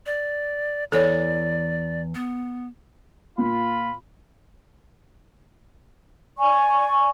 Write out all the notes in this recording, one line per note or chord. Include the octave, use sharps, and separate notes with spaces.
D5
E2 E3 A4 C#5 D5
B3
A#2 F4 B5
D5 G#5 C#6